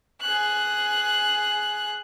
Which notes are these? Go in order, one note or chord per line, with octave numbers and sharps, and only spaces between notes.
G#4 F#6